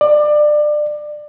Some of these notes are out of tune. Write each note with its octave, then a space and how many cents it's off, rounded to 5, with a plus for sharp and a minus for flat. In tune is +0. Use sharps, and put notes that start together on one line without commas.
D5 +25